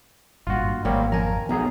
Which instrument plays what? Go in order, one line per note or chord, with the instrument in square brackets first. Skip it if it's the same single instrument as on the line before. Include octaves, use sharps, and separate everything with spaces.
[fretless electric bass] G#1 G2 A#2 [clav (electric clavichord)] F4 F#4
[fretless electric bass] G#1 [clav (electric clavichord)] G3 C4 C#5 [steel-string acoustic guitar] A#3
[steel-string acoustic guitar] F2 A#4 [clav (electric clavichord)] G#5 A#5
[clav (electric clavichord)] B1 G#4 [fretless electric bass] B3 [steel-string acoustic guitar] A#5